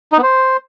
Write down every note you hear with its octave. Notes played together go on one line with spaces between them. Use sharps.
D#4
B3
C5